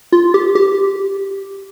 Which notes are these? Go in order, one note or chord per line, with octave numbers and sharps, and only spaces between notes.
F4
G4
G4